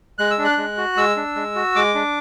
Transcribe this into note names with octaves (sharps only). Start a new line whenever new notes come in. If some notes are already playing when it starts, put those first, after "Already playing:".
G#3 F#6
E6
D4
F#6
G#3
F#4
G#3 E6
D4
G#3
F#4
G#3 D6
D4